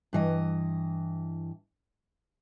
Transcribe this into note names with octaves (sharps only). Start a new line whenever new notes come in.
G2 E3 D#5